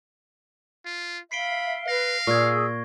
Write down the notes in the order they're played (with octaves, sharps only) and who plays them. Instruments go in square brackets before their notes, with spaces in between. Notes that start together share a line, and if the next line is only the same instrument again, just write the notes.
[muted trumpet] F4
[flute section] E5 F5 [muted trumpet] B5 [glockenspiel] C7 D7 G7
[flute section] B4 [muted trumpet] F5 [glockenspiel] A#6
[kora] A#2 [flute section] G#4 E6 [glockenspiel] C#6 G#6